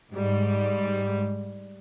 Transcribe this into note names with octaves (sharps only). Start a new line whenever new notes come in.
G#2 G3